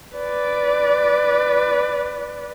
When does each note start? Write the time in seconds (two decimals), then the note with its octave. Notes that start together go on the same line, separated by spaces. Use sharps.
0.16 B4 D5